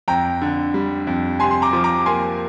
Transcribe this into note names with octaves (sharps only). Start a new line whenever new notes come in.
F2 G5 A#5
D3
G3
F2
C3 G#5 C6
C6
A#5 D6
F3
A#5 D6
A#3 G#5 C6